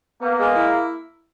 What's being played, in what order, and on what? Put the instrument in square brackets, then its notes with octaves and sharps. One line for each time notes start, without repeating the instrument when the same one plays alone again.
[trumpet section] A#3 [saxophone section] B3
[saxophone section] G#3
E4